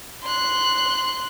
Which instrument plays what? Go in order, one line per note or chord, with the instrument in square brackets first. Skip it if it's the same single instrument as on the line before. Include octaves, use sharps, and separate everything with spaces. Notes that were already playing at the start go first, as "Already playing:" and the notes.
[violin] C6 F#6